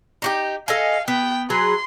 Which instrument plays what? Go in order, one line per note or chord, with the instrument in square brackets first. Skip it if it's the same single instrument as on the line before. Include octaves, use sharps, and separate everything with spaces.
[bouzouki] D#4 F#4 G4
[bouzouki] A4 D#5 G#5 [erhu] F5
[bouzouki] B3 [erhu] G5
[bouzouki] F#3 G#4 B4 [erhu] C6